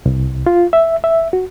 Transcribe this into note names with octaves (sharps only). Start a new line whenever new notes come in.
C2
F4
E5
E5
F#4